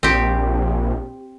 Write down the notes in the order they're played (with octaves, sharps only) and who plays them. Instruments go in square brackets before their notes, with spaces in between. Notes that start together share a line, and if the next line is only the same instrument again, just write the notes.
[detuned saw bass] A#1 [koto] C4 G4